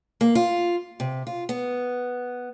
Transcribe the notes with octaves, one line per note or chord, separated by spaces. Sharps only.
A#3
F4
C3
F4
B3